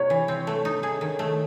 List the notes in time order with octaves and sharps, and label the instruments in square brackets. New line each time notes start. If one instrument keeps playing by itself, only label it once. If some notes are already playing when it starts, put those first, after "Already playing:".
Already playing: [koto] C3 [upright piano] C#5
[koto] E3
C4
A3
D#4
G#4
D#3
A3